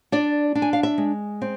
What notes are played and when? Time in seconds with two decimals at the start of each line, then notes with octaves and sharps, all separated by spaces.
0.12 D4 D5
0.55 D4
0.62 G#5
0.73 F5
0.83 E5
0.98 G#3
1.42 C4